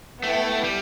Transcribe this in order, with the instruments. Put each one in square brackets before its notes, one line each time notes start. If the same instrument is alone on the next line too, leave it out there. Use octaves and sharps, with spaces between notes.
[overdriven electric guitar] A3 [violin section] B3 E4 A4 G5
[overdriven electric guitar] G3